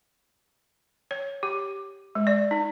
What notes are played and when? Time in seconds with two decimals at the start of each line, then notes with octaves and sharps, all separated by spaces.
1.11 C#5
1.43 G4
2.15 G#3
2.27 D5
2.51 D#4